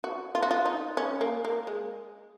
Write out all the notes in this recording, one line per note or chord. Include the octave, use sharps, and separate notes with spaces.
F#4
F4
F#4
F4
D#4
C#4
A#3
A#3
G#3